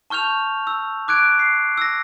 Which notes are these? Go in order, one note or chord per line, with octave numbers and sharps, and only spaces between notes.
A5 C#6 F6 G6 F7
E6
D6 F#6 G#6 D7
C7
E6 A#6